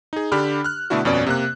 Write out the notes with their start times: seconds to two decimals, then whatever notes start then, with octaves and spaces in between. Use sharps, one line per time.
0.13 D#4 G#4
0.32 D3 D4 G4 B5 F6
0.64 F6 F#6
0.90 B2 D3 A3 D4 E4 F#4
1.04 G1 F2 B2 C#4 D5
1.27 C3 A#3 F#6